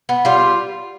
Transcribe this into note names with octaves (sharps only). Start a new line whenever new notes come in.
B3
G3 F4